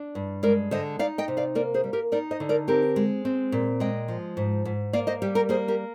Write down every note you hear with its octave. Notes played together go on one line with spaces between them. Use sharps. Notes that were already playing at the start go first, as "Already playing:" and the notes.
Already playing: D4
G2
G#3 A#4 D5
D3 C5 D#5
D#4 D5 F5
D#5 G5
C3
D5 F5
A#3 A#4 D5
G#4 C5
G3
G4 A#4
D#4 A#4 D5
C5 D#5
D3
A#4 D5
C4 G4 A#4
G#3
C4
A#2
G#3 D#5 G5
F3
G#2
G#2
A#3 D5 F5
C5 D#5
G3 G4
G4 A#4
A#3 G#4 C5
G4 A#4